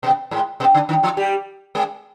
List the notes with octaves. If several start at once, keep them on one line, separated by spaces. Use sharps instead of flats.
B2 B3
G#2 G#3
B2 B3
D3 D4
D#3 D#4
F3 F4
G3 G4
G#3 G#4